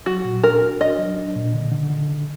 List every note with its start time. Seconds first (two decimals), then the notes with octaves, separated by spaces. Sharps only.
0.06 F#3 F#4
0.25 A#2
0.43 D4 A#4
0.62 F#4
0.81 D4 D#5
0.98 F#3
1.16 D4
1.35 A#2
1.54 D3
1.72 D3
1.90 D3
2.09 D3